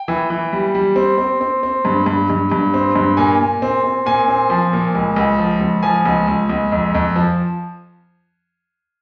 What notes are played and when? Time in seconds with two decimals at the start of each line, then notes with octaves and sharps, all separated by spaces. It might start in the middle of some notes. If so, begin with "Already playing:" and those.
Already playing: G5
0.08 E3
0.30 E3
0.53 G3
0.75 G3
0.96 C4
1.18 C4
1.41 C4
1.63 C4
1.85 G2
2.06 G2
2.30 G2
2.52 G2
2.74 C4
2.95 G2
3.17 A#2 G#5
3.40 A#2
3.62 C4
3.84 C4
4.06 A#2 G#5
4.28 C4
4.50 F3
4.73 A#2
4.95 C#2
5.16 C#2
5.39 F3
5.61 C#2
5.83 F3 G#5
6.05 C#2
6.28 C#2
6.49 C#2
6.72 F2
6.94 F2
7.16 F3